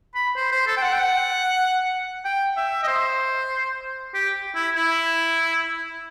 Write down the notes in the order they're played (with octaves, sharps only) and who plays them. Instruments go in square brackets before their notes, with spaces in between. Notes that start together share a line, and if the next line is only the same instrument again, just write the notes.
[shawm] B5
C5
C5
A4
G5
F#5
G5
F#5
G5
E5
D#5
C5
G4
E4
E4